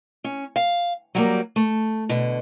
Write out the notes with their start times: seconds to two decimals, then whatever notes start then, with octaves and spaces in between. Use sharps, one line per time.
0.24 C#4
0.56 F5
1.15 F#3 G3 A#3
1.56 A3
2.09 B2 D3